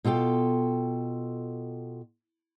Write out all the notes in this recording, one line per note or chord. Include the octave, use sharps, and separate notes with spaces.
B2 F4 A4 G5